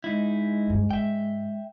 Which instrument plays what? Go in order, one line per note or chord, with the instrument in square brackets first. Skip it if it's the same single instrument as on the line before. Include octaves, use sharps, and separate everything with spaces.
[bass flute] G#3 [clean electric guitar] D#4 E4
[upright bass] D2 G2
[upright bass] G#2 [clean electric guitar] E5 G5